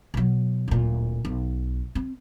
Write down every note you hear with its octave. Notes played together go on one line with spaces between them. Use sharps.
B2 F#3
D1 A#2
B1
C4